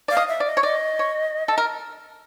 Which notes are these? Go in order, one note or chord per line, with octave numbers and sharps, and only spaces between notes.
D5 F5
D#5
E5
D5
D#5
C#5
D5 D#5
C#5
A4
A#4